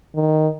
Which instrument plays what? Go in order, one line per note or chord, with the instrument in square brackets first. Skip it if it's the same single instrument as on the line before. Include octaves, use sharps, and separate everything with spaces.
[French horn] D#3